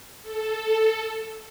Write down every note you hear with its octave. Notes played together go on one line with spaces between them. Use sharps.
A4